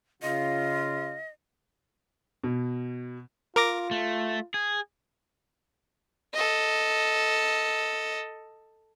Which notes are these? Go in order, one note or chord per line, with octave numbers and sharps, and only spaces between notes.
C#3 F4 D#5
B2
F4 A#4 D6 A#6
A3
G#4
A4 D#5